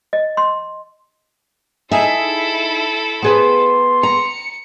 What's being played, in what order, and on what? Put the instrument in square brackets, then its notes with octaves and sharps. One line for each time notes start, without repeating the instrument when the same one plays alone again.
[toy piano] D#5
C6
[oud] D#4 G#4 [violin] E4 A4 [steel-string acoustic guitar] E5
[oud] B3 G#4 B4 [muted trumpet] C6
[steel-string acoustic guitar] A#5 [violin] C#7